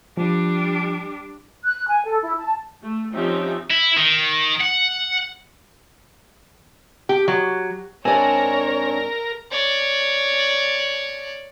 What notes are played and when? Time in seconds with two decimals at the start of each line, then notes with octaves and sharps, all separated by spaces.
0.17 F3 G3 D4
1.64 F#6
1.88 G#5
2.05 A4
2.21 E4
2.39 A5
2.83 A3
3.14 F3 C4 C#4 D#4 G4 E5
3.70 E4
3.97 D#3
4.60 F#5
7.09 G4
7.28 F#3
8.05 G#2 C4 D4 A#4 C#5 D5 G#5
9.52 C#5 D5